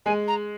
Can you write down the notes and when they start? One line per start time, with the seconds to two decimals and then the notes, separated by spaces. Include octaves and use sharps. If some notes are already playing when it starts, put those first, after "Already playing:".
0.06 G#3 G#5
0.28 A#5